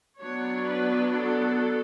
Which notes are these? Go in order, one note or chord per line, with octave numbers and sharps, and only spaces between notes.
F#3 B3 D4 C#5
B4
A4